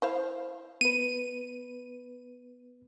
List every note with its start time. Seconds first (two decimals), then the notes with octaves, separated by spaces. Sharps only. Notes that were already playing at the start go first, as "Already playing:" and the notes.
0.02 E4 C5 F5
0.81 B3 B4 D#7